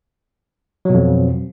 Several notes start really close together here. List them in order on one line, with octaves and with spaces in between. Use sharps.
F#3 B2 F2